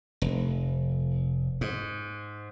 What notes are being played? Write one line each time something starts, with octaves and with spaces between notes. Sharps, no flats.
F1
G#2